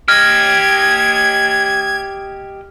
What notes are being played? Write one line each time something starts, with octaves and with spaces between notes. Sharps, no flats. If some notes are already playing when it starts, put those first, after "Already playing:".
G4 D#5 F6 G#6